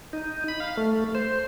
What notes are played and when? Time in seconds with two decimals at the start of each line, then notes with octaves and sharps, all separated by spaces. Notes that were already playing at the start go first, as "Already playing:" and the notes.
0.13 D#4
0.48 B5
0.60 F5
0.77 A3
1.15 C5